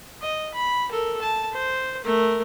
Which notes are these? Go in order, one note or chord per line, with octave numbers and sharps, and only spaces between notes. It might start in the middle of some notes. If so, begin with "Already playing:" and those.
D#5
B5
A4 A#4
A5
C5
A3 A#4